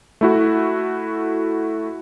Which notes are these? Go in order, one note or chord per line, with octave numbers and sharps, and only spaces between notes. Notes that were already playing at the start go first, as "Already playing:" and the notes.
A3 E4 F#4